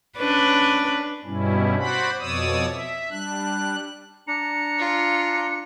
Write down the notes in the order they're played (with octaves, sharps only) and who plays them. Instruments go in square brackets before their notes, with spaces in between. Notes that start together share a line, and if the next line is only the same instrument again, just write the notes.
[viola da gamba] C#4 D4 B4
[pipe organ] G2 B2 G3 C#4 E4
F#4 C5 D5 F#5 B5
F2 B2 C#5 D5 D#6 E6
E5
G3 D4 F#6
[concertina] D4 A#5 [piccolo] C#7
[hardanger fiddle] F4